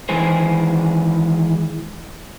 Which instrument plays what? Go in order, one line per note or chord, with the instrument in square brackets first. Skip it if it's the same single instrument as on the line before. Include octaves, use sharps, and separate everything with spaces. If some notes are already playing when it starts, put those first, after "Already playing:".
[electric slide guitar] D#3 E3 G#3 G#4 C5